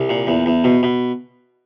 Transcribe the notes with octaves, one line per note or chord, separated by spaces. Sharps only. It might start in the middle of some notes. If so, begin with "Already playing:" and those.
Already playing: C2
A#2
E2
E2
B2
B2